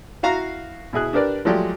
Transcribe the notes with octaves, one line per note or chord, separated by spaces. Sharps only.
E4 F#4 F5 A#5
B2 E4 G#4 F#6
D4 G4 A#4 B4 D5
F3 F#3 G#3 A3 G4 D5